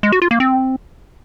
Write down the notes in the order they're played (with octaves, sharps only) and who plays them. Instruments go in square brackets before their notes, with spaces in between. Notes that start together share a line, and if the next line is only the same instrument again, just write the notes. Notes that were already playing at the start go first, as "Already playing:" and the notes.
[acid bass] G#3
F#4
F4
A#3
C4